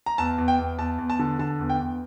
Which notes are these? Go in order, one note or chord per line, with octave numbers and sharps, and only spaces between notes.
A#5
E2 A5
E2
G5
E2
E2 A5
E2
A5
D3
D3 A5
E2
G5
E2